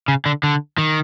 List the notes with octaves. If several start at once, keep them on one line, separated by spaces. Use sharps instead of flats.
C#3
D3
D3
D#3